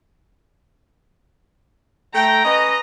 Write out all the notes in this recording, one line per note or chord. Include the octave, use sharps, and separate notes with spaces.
A3 G5 A#5
C#4 B4 D#5